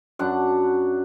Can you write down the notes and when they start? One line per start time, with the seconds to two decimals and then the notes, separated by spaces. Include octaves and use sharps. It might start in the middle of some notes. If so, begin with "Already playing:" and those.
0.19 F#2 D4 F#5